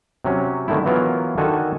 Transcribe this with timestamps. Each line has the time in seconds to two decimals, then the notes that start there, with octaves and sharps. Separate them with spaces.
0.25 C3 F#3 C#4
0.68 D3 D#3 A3 E4
0.85 E3 F#3 B3 F4 A#4
1.38 D3 D#3 F#4 A4 G#5 A5